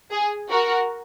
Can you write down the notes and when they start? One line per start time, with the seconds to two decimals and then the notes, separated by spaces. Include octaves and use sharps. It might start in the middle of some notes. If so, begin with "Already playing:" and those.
0.12 G#4
0.50 F#4 A#4